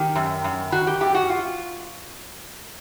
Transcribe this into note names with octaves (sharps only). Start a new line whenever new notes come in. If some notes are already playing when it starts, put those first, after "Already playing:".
Already playing: D#3 G4
F#2
F#2
D#3 F#4
G4
F#2 G4
F#4
F4